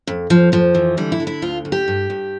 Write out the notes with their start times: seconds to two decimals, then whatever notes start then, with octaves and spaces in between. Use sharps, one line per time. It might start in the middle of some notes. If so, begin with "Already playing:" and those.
0.07 F2
0.30 F2 F3
0.52 F2 F3
0.75 E3
0.97 D3 G3
1.12 E4
1.20 D3
1.27 E4
1.42 D2 F4
1.65 D2
1.72 G4
1.88 G2
2.10 G2